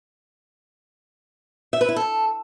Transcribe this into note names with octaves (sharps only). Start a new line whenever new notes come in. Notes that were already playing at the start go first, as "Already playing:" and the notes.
E5
B4
E4
A4